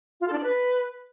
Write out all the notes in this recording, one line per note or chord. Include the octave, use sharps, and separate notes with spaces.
F4
A4
D4
D5
B4